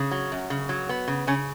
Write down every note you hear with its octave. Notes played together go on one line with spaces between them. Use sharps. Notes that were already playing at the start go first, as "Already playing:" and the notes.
Already playing: C#3
F#3
F#2
C#3
F#3
B3
C#3
C#3 C#4